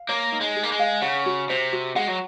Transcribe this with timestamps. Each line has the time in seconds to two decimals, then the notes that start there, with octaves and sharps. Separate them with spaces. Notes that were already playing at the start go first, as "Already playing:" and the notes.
Already playing: F5
0.09 A#3 C#5
0.32 D#4
0.41 G#3
0.56 G#4
0.63 A#3
0.72 G#3
0.79 F5
1.02 C#3 F#5
1.26 F#4
1.50 C3 C5
1.73 F#4
1.96 G#3 F#5
2.08 F#3